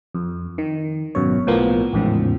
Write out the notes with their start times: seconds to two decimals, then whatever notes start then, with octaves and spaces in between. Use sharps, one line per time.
0.15 F2
0.58 D#3
1.15 G#1 F#2 B2 C#5
1.47 B1 A2 F3 A#3 B3
1.93 A1 E2 G#2 C#3 F3